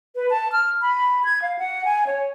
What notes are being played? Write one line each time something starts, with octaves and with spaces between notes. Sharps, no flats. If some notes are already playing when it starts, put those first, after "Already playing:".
B4
A5
F6
B5
G#6
F5
F#5
G#5
C#5